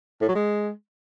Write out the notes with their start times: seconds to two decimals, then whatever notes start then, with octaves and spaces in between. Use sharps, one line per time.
0.21 A2
0.28 F#3
0.35 G#3